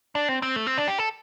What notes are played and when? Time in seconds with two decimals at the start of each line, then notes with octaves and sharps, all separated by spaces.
0.15 D4
0.29 C4
0.42 C4
0.56 A3
0.67 C4
0.78 D4
0.88 G4
0.98 A4